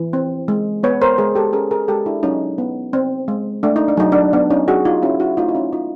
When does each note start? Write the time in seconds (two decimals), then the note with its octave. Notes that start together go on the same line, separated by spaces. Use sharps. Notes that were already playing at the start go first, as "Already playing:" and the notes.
Already playing: E3
0.13 C4
0.48 G#3
0.83 B3 B4 C#5
1.01 A#4 C5
1.18 G#3 G#4 A#4
1.35 G4 A4
1.53 C#4 G#4 A#4
1.71 G#4 A#4
1.88 G#3 G4 A4
2.06 D4 E4
2.23 F#3 C#4 D#4
2.58 B3
2.93 C4
3.28 G#3
3.63 A3 D4
3.76 D#4
3.88 D4
3.97 F#3 D#4
4.12 D4
4.33 B3 D4
4.50 C#4 D#4
4.68 F#3 F#4 G#4
4.85 D#4 F4
5.02 C#4 E4 F#4
5.20 E4 F#4
5.37 A3 D#4 F4
5.48 E4
5.55 C#4 D#4
5.73 C#4 D#4 F4